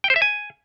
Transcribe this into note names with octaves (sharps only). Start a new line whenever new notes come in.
G5
C5
E5
G#5